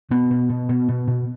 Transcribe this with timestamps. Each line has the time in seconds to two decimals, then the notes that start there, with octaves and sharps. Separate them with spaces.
0.10 B2 B3
0.30 B2
0.49 B2
0.69 B2
0.88 B2
1.07 B2